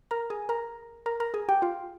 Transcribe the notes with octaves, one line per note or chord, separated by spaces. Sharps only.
A#4 A#5
G#4 G#5
A#4 A#5
A#4 A#5
A#4 A#5
G#4 G#5
G4 G5
F4 F5